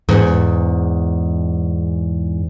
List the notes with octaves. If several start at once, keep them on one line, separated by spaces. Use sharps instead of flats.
E2 G#2